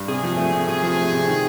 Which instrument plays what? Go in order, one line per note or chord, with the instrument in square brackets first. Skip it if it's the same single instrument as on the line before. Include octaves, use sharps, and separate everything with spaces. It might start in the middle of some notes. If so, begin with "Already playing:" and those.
Already playing: [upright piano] G2
[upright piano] C3 [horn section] G#4
[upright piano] F3
A3
C3
[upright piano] C3 [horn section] G#4
[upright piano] F3
A3
C3
D#3